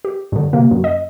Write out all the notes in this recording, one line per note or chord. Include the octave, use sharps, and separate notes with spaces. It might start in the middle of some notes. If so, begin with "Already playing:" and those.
G4
G2 D3
C3 A#3
F#2
D#5